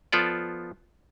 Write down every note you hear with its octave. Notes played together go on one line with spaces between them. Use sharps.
F3 B3 F4 A4 D5